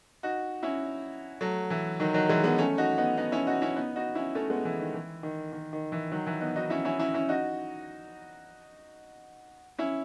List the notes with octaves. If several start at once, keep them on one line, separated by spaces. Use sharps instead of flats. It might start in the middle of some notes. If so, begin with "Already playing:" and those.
D#4 F#4
C#4 E4
F#3 A3
E3
D#3 F#3
D#3 F#3
E3 G#3
G#3 B3
A3 C#4
D#4 F#4
B3 D#4
B3 D#4
C#4 E4
D#4 F#4
C#4 E4
B3 D#4
D#4 F#4
C#4 E4
A3 C#4
G#3 B3
E3
D#3
E3
D#3
D#3
D#3
E3
D#3 F#3
E3
B3 D#4
D#4 F#4
C#4 E4
C#4 E4
C#4 E4
C#4 E4
D#4 F#4
C#4 E4